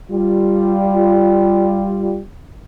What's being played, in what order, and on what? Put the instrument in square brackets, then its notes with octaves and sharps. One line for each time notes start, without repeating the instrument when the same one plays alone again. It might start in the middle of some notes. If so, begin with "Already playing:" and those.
[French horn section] G3 F4